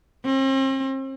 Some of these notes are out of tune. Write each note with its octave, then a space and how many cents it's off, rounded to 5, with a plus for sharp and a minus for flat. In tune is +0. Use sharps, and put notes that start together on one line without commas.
C4 +40